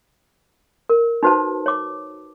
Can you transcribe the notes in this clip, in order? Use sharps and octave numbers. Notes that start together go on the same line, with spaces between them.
A#4
D#4 F#4 B4 C5 A5
C#5 D6